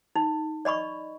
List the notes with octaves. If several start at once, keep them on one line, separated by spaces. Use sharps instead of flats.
D#4
D5 D#5 B5 C#6